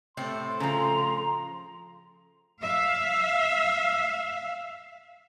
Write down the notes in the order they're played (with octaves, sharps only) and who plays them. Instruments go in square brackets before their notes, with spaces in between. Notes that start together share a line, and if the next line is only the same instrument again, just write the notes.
[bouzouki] A2 C4 A4 [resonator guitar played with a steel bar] C3 [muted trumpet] C6
[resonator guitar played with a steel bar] C#3 F3 [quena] A#5
[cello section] E5 F5